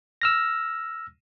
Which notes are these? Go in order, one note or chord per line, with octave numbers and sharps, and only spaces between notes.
E6 F6 A#6